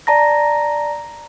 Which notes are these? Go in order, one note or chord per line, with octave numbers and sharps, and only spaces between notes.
D5 A5 A#5 A#6